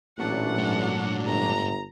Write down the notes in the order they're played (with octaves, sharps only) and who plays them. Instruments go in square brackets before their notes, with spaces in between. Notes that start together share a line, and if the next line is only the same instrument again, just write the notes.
[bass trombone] A1 [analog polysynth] A#2 F#3 D4 [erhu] F#5
[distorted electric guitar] G#2 A3
[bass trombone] G1 [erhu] A#5